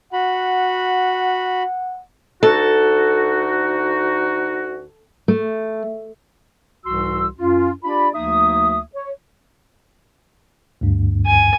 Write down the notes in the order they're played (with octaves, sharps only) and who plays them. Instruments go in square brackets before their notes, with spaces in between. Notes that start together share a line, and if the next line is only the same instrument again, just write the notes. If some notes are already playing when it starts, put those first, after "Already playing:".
[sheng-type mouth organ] F#4 B5 [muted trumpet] F#5
[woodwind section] D2 D#4 F#4 [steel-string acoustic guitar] A4
[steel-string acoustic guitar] A3
[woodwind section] C2 G#2 E3 F#4 C6 E6
F#2 C#4 F4
D4 F4 G4 D5 B5
D2 F3 A#3 D#4 E5 D#6
C#5
[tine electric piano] D2 G2
[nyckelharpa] G#5